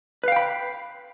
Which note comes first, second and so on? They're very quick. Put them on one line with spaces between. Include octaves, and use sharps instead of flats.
B4 F5 G5 B5